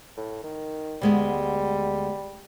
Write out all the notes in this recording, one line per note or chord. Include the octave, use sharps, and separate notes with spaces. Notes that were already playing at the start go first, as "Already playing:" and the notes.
A2
D#3
D2 G3 G#3 B3